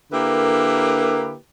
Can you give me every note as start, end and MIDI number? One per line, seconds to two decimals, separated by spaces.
0.11 1.36 50
0.11 1.36 58
0.11 1.36 64
0.11 1.36 67
0.11 1.36 70
0.11 1.36 71